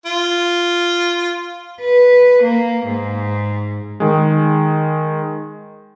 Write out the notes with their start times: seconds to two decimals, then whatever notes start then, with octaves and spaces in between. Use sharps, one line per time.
0.06 F4
1.80 B4
2.43 A#3
2.87 G#2
4.00 D#3 G#3